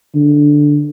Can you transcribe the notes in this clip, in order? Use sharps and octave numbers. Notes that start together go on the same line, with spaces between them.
D3